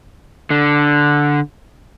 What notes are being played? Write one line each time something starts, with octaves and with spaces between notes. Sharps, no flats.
D3